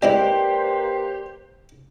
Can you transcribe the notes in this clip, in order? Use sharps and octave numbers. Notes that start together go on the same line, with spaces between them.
G#3 A#3 C4 E4 G4 B4 C5 D5